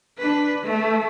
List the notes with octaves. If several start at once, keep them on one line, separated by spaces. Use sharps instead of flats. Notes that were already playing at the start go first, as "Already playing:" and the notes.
D4 B4
A3